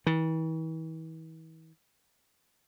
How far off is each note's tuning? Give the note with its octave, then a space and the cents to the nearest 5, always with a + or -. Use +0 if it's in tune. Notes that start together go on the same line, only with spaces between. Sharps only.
E3 -40